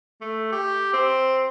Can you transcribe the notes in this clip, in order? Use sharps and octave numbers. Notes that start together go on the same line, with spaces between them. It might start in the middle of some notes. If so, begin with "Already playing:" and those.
A3
G4
C4